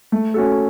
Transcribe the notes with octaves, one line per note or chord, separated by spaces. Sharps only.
A3
C#4 F#4 A4